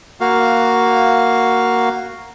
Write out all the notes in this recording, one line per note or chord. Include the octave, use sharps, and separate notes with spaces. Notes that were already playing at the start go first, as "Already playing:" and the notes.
A#3 F#4 F5